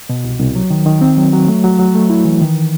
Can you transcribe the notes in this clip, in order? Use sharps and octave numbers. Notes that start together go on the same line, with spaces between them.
B2
C2
C2
F#3
D#3
D#3
C4
F#3
F#3
A3
F#3
F#3
A3
E4
E3
D#3